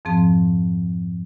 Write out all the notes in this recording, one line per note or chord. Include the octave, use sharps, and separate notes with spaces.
F2 G#2 F3 C4 G#4 A5